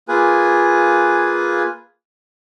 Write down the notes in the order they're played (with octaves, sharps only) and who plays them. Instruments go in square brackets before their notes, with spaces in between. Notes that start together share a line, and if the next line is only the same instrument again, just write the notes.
[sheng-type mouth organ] A#3 F4 G#4 B4 G#5